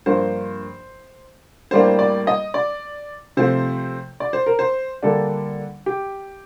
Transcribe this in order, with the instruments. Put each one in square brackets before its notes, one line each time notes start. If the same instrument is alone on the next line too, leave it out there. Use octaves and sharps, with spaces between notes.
[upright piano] G2 F3 A#3 C5
A2 G3 A#3 D4 C5
D5
D#5
D5
C3 F3 A3 C4 C5
D5
C5
A#4
C5
D3 G3 A#3 D4 A4
G4